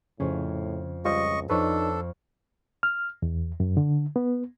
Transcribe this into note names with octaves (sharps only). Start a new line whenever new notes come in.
F2 A2 C#3 C#4
C#2 G3 F4 C5 D#5 C#6
F2 D4 D#4 A4 B4 C#5 C#6
F6
E2
F#2
D3
B3